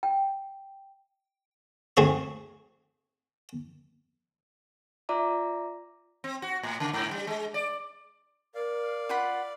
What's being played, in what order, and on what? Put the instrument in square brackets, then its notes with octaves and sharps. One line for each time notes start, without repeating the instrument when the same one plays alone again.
[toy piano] G5
[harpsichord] D2 C4 G#4 C#6
[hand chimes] F4 D5 E5 A#5 D6
[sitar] C4
F#4
A2
C#3
G#2
G3
G#3
D5
[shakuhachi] A#4 [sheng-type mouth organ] D5 F5
[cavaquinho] F4 F#5 B5